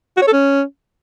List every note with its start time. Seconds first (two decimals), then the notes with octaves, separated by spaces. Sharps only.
0.17 F#4
0.22 C#5
0.27 A4
0.33 C#4